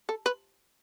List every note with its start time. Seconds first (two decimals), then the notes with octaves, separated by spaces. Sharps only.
0.09 A4
0.26 B4